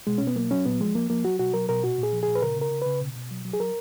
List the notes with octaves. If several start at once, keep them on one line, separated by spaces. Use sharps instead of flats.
B2 G#3
B2 C#4
B3
F#3 A#3
F#3 C#4
A#2 B3
F3 G#3
F3 A#3
F3 A#3
F#3 F#4
B2 F#4
F#3 A#4
B2 A#4
A#2 F#4
A#2
G#4
F3
A#2 G#4
B4
C#3 A#4
C#3 A#4
C#3
C#3 B4
B2
B2
F#3
F#3
G#4
F#3 A#4